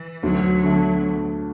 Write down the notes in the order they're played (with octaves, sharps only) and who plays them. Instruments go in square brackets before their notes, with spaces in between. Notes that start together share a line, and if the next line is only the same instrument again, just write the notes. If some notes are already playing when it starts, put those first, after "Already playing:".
Already playing: [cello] E3
[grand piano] D2 [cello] F#3
[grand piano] D3 A3